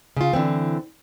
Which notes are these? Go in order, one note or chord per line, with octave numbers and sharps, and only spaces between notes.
C#3 F4
D3 E3 C4